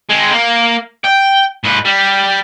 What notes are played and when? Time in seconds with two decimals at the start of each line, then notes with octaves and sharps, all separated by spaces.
0.10 G#3 C4
0.32 A#3
1.05 G5
1.64 G#2 B4
1.85 G3